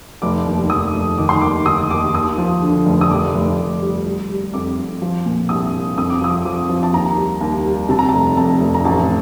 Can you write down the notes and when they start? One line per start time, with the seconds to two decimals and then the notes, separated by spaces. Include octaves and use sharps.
0.22 F1 D6
0.46 D#2
0.70 F1 D#6
0.94 F1
1.18 D#3 D6
1.29 C6
1.41 D#2 D6
1.66 D#3 D#6
1.91 D#2 D6
2.14 D#2 D#6
2.38 F3
2.62 D3
2.86 F1
3.01 D#6
3.10 F1 D6
3.35 F1
3.58 F1
3.82 G3
4.06 G3
4.29 G3
4.54 F2 D6
4.78 F2
5.02 F3
5.26 A#2
5.49 C2 D#6
5.73 C2
5.98 F2 D#6
6.10 D6
6.21 F3 D#6
6.45 F3 D6
6.69 F3
6.83 A5
6.93 D#2 A#5
7.17 G3
7.41 D#2
7.65 G3
7.89 C3 A5
7.99 A#5
8.09 A5
8.14 F1
8.37 F2 A5
8.61 F1
8.74 A#5
8.85 A1 A5